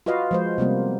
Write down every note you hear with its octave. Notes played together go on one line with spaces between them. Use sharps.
F4 F#4 B4 D#5 F5
F3 G#3 C5
C3 G3 A#3 B3